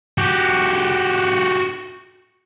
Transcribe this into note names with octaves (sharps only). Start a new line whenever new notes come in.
F#4 G4